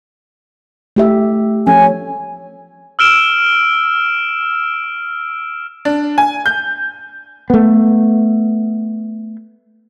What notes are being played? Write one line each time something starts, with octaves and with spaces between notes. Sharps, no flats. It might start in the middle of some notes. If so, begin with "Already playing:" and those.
A3 G4 E5
F3 C#4 A4 G#5
E6 F6 D7 E7
D4
G#5
G6
A3 B3